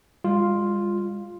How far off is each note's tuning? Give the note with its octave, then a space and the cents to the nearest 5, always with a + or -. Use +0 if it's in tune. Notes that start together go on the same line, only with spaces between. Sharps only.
G#3 -45 F4 +0